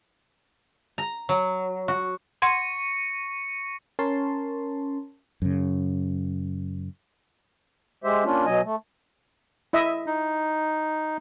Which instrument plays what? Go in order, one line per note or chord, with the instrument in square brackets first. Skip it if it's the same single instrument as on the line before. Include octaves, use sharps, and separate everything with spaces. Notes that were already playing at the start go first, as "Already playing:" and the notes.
[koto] A#5
F#3
F#4
[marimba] F#5 C6 G#6 [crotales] C#6 A#6 C#7
[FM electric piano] C#4 A#4 C#5 A5 C6
[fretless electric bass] F#2 C#3
[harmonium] G#3 G4 C5 E5
A#3 C#4 D4 F4
B2 F#3 D#5 G#5
A3
[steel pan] E4 D#5 E5
[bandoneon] D#4